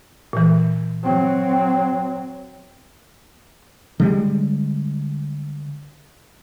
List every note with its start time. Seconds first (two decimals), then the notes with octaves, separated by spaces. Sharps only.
0.33 A#2 E3
1.03 F#3 C4
4.00 D3 G3 G#3